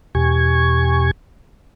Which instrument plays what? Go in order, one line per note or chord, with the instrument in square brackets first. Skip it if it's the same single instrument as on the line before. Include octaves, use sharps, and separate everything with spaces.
[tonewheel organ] E2 B2 G4 G#5 C#6 G#6